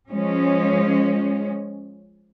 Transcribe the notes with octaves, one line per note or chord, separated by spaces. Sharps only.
F3 G#3 C#4